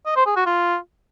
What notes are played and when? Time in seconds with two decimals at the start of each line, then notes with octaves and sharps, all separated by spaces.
0.06 D#5
0.16 C5
0.26 G#4
0.36 F#4
0.46 F4